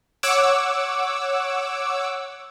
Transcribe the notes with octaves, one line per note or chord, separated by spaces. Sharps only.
C#5 F#5 D6 E6